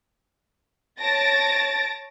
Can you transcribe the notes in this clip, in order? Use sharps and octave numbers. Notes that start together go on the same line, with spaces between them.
C#5 A5 A6 A#6 D7